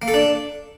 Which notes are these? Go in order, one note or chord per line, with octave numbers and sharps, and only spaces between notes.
A#3
A4
D4